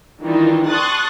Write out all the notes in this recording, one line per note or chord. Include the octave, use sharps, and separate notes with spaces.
D#3 E3 G3 D4 D#4 F4
A5 C6 C#6 D#6 F#6 A6